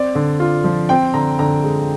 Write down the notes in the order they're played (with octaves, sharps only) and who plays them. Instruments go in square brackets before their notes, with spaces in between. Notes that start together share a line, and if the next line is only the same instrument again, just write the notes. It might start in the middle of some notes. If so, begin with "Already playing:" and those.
Already playing: [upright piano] C4 D5
D3
F4
F3
C4 G5
D3 A#5
D3 A#5
G#3